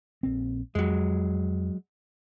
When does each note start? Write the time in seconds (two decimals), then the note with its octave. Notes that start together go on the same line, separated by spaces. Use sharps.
0.23 A#1 C4
0.75 F2 F#3 G#3